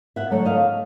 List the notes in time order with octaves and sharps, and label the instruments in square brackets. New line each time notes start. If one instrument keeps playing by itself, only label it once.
[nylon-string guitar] E5 F#5
D3 F#3 A3
D#5 F5